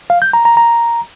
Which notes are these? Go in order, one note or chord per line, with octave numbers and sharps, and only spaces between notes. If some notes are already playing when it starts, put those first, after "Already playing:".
F5
G6
A#5
A#5
A#5